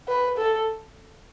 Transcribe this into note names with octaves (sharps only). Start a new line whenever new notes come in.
B4
A4